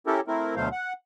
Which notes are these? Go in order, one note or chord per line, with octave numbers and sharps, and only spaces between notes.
C#4 E4 G4 A4 A#4
A3 C4 E4 A#4
D2 B2 F#3 A3 C5 F5
F#5